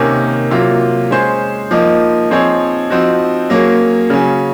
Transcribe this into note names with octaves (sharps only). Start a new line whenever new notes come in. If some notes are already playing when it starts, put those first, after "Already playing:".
Already playing: C3 D#3 A#3 C#4
C3 F#3 A#3 F4
G#3 C#4 G#4 C5
F3 A#3 D#4
F3 C4 D#4 G#4 C#5
F3 C4 D#4 F#4
F#3 A#3 C#4 G#4
C#3 F#3 C#4